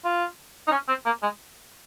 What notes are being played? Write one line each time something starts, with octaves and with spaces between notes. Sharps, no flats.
F4
D#4
C#4
C4
A#3
G#3